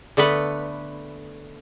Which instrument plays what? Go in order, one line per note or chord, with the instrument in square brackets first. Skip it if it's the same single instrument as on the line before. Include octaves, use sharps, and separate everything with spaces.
[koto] D3 A3 B3 B4